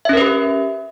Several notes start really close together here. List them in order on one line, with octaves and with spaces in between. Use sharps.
E5 C#4 A#4 B4 G4